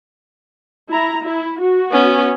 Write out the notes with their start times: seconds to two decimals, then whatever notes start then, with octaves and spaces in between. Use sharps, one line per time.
0.89 E4 A#5
1.23 E4
1.60 F#4
1.91 B3 C#4